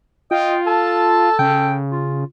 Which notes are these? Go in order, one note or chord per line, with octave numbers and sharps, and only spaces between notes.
F4 D#5 G5
A4 A5
C#3 G5
F4